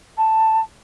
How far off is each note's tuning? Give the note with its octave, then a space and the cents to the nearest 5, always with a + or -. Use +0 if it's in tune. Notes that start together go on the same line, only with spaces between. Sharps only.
A5 +5